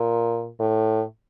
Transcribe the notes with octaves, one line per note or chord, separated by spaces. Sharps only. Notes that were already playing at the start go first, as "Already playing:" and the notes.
Already playing: A#2
A2